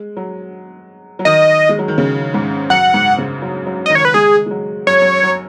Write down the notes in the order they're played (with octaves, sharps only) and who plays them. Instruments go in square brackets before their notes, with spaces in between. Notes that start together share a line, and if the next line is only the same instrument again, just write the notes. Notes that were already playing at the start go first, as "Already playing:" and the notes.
Already playing: [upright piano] G#3
F#3
F#3
[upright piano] D#3 [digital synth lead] D#5
[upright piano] G#3
F#3
D#3
C#3
G#2
[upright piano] F#2 [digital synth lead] F#5
[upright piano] G#2
C#3
F#3
F#3
[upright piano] D#3 [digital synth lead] D#5
[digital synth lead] C#5
B4
[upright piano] G#3 [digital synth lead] G#4
[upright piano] G#3
F#3
[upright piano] F#2 [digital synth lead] C#5
[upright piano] F#2
F#3